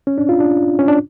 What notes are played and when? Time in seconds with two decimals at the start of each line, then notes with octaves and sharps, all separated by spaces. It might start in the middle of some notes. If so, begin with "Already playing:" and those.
0.07 C#4
0.18 D4
0.29 F4
0.40 D4
0.79 C#4
0.88 D4